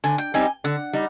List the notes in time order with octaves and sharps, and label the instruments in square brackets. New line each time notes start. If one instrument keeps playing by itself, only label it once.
[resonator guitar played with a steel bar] D3 [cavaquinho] G#5
[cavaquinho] G5
[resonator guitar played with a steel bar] G3 C4 D#4 G4 [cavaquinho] G#5
[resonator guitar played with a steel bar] D3 [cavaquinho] F#5
[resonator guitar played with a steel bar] G3 D#4